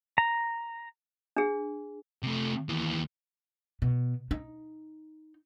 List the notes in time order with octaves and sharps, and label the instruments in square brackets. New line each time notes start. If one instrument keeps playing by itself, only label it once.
[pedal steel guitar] A#5
[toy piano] D4 G#4
[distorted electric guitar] C3 A3
D#2 E3
[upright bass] B2
D#4